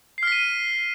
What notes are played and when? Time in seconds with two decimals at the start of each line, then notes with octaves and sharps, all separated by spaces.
0.18 C7
0.23 F6
0.27 B6
0.32 D#7